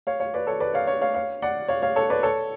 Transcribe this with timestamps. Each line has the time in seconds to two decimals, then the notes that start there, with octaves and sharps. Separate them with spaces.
0.07 C#5 F5
0.20 C#5 F5
0.34 B4 D5
0.47 A4 C#5
0.60 B4 D5
0.74 C#5 F5
0.87 C#5 F5
1.01 C#5 F5
1.14 C#5 F5
1.42 D5 F#5
1.68 C#5 F5
1.82 C#5 F5
1.96 A4 C#5
2.10 B4 D5
2.23 A4 C#5